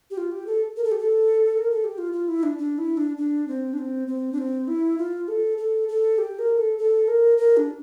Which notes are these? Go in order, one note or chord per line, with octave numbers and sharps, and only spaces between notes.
G4
F4
G4
A4
A#4
A4
G4
A4
A#4
A4
G4
F4
F4
E4
D4
D4
E4
D4
D4
C4
D4
C4
C4
D4
C4
E4
F4
A4
A4
A4
G4
A#4
A4
A4
A#4
A#4
D4